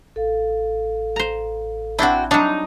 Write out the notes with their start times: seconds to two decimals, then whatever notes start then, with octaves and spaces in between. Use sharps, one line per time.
0.16 A1 A4 F5
1.16 C5 A#5
1.99 C4 D4 E4 F#4 G5
2.31 F#3 G3 D4 D#4